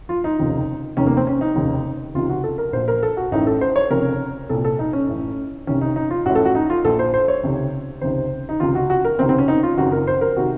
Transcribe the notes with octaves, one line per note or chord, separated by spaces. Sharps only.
F4
D#4
F1 D#2 C#3
F1 D#2 D#3 C#4
A#3
C4
C#4
D#4
F1 D#2 C#3
C#2 C3 D#3 F4
F#4
A4
A#4
A#1 A#2 C5
A#4
A4
F#4
A1 A2 D#4
A4
C5
C#5
F1 F2 C#3 A#4
C2 A#2 A4
A4
D#4
C#4
A1 A2
C2 C3 D#3 C#4
D#4
D#4
F4
A1 A2 F#4
A4
F#4
D#4
F4
A#1 A#2 A4
C5
C5
C#5
C#2 C3 D#3
C#2 C3 D#3 C5
D#4
C#2 C3 D#3 F4
F#4
F#4
A#4
C#2 C3 D#3 C4
C4
C#4
D#4
F4
F#1 F2 D#3 F#4
A#4
C5
A#4
C3 D#3 F#4